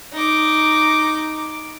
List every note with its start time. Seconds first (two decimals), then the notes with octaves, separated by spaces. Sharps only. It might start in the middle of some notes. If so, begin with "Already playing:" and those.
0.13 D#4 D6